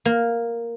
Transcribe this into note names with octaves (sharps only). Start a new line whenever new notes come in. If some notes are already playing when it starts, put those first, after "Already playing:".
A#3